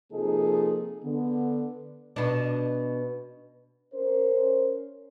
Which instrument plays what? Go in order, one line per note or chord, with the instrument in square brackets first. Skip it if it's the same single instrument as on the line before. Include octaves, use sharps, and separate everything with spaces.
[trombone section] C3 F3 A#3 D#4 G#4 A4
D3 B3
[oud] B2 D4
[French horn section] C#4 A#4 C5